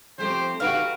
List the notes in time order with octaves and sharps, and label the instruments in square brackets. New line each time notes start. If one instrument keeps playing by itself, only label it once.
[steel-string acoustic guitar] F3 A3 C4 [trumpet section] G4 C5
[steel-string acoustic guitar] D3 D#4 G4 [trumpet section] F#4 [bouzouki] B4 F5 [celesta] F6 D7